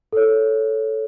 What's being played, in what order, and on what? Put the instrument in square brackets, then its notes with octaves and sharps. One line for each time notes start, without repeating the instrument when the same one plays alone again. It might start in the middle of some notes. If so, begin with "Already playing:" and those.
[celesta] A4 C#5